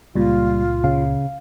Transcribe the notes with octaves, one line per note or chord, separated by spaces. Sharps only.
C#2 A#2 G3 F4
C#3 F5